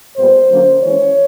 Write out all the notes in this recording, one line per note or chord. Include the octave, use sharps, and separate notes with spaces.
A#2 G3 B3 C5
D3 F#3 A#3 C#4
E3 G#3 C#4 C#5